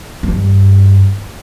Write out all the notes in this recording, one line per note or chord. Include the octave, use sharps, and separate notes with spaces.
G2